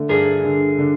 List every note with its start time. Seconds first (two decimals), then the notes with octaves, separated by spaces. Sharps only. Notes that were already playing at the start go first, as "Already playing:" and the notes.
Already playing: D3 A3
0.09 G2 G#4 A#4
0.44 D3
0.79 D3